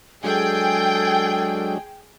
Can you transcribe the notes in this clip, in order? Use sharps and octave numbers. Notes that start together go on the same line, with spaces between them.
F#3 G#3 D4 G#4 A4 G5